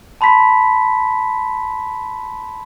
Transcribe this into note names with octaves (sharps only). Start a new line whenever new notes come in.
A5 B5 C6 B6